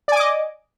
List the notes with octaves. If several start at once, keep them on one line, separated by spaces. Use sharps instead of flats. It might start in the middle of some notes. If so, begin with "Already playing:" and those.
D5 D#5 G#5 D6